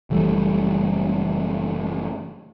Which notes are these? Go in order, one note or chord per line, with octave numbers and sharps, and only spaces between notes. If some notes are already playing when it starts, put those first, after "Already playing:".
F#1 E3 G3 A3